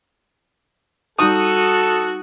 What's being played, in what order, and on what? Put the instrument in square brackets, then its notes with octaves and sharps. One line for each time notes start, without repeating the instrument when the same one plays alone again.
[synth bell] G3 D#4 A5 [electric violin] F#4 [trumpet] A4 [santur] D#6